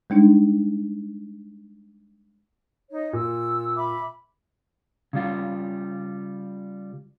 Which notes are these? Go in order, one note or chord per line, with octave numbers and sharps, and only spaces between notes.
G3 G#3 D4 D#4
D#4 C#5
A#2 E6
E5 B5 D6
C#3 G3 F4